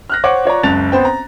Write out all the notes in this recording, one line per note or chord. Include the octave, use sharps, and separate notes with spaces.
F6 F#6 A#6
C5 C#5 F#5 D6
F4 C#5 D5 A#5
F#1 C#2 A5 A6 F7
B3 C4 C5 G5
A#5